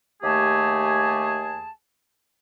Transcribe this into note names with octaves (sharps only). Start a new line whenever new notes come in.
D#2 A3 G4 G#4 G#5 A5